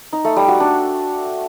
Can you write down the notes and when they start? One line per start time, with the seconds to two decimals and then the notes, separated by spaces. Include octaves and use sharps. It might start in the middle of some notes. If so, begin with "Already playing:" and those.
0.13 D#4
0.24 A3
0.36 G3
0.48 F#4
0.60 D4